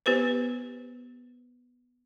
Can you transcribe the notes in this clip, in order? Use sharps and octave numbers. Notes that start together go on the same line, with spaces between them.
B3 G4 B4 C5